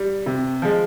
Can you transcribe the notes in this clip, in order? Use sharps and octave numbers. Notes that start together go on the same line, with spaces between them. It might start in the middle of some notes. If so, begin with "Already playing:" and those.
Already playing: G3
C3
F3 G#3